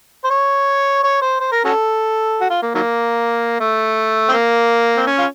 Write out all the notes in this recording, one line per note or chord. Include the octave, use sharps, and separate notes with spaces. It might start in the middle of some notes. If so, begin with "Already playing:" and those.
C5
C#5
C#5
C5
C5
A#4
C#4 F#4 A4
F#4
F4
A#3
D#3 F#3 A#3
A3
C4
A#3
C4
C#4
F4